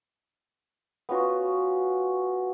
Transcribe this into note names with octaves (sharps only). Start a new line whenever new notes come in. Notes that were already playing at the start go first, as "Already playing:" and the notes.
B3 C#4 F4 F#4